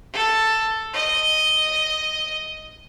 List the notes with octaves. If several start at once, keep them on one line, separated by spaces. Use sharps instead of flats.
A4
D#5